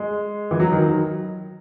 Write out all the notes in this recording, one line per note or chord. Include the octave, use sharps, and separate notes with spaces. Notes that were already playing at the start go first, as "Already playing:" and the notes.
Already playing: G#3
E3
F#3
D#3
F#3